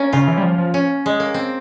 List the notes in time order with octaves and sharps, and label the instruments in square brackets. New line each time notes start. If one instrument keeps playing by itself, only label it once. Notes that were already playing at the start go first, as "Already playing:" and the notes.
Already playing: [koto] A#3 C#4
[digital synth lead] C#3 [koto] F4
[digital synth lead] E3
G3
F3
F3
[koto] C#4
G#3
A#3
C4